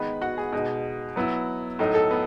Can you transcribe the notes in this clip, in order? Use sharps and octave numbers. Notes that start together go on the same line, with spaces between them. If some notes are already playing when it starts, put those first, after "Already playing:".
Already playing: D#3 G#3 B3 D#4 B4 B5
F#4 F#5
G#4
B2 G#3 D#4
F#3 B3 E4
A2 F#3 A3 D#4
A4
B3